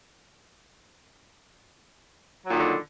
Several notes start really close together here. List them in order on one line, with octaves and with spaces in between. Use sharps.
F#3 A#2 D#3 D3